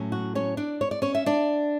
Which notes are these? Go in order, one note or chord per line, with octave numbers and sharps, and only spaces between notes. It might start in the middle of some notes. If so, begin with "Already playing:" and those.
Already playing: A2 F#3 C#4
F#4
C#4 C#5
D4 D5
C#5
D5
C#4 C#5
E5
D4 D5